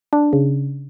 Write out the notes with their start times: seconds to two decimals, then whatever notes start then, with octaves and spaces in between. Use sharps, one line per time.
0.13 D4
0.33 C#3